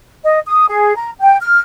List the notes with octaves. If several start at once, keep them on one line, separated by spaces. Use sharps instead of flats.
D#5
D#6
G#4
A#5
G5
F6